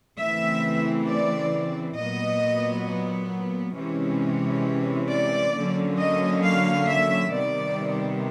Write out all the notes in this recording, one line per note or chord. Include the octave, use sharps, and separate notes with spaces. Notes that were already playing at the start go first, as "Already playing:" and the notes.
C#3 E3 A3 C4 E5
D5
A#2 F#3 B3 D#5
C3 E3 G#3 C#4
D5
D3 F#3 A#3 C#4
D#5
F5
E5
C3 D#3 G3 B3 D5